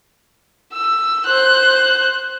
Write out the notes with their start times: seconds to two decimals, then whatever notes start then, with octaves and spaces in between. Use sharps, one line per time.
0.73 E6
1.26 C5 F#6